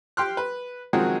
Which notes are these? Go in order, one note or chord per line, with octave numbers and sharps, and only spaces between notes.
G4 G5 C6 F6 F#6
B4
D#3 F3 F#3 G#3 C4 F#4